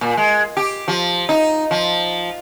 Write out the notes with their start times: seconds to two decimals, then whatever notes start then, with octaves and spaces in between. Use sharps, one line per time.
0.01 A#2
0.17 G#3
0.57 G4
0.88 F3
1.29 D#4
1.71 F3